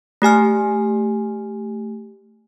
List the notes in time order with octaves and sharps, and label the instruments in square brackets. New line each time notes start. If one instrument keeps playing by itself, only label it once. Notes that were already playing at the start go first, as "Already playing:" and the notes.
[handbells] A3 G4 G#5 F6